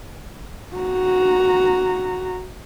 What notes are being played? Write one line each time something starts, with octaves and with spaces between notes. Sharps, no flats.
F#4 A#5